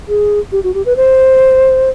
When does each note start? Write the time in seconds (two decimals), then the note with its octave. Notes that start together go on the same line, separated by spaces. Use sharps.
0.08 G#4
0.52 G4
0.64 F#4
0.74 G4
0.86 B4
0.97 C5